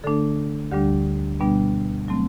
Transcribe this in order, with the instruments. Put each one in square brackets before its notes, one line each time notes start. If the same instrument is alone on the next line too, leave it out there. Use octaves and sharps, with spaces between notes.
[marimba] D3 A3 D4 A4
D2 D3 G3 D4 G4
B2 G3 B3 D4
F#3 A3 C4